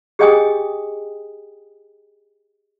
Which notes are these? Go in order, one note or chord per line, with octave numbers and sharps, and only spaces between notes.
G4 G#4 D#5 G5 G#5 D#6